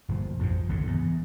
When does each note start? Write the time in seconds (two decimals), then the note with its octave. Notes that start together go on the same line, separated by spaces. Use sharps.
0.09 G1 A#2 F3
0.39 A#1 F2 G#2 F3
0.69 G#1 C#2 F#2 D3
0.87 E2